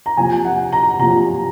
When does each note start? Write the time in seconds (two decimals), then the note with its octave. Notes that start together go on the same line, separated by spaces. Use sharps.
0.06 A#5
0.17 C3 F3 A#3 F4 G#5
0.45 F#5
0.72 A#5
0.99 C3 F3 A#3 F4 A#5